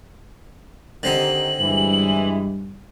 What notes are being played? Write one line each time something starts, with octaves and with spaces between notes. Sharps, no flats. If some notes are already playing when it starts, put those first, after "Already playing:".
D3 D#3 C4 D#4 G4 F#7
G2 E3 G3 G#3